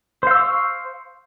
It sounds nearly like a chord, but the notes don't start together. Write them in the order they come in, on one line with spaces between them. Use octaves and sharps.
C5 F5 E6 C#6